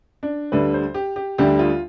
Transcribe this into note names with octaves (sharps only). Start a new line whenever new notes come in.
D4
D2 D3 G3 B4
C5
G4
G4
D2 D3 G3 G4
F4